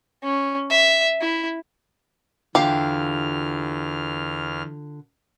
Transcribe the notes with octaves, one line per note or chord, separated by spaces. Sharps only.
C#4
E5
E4
E2 D3 F4 G4 F5 F6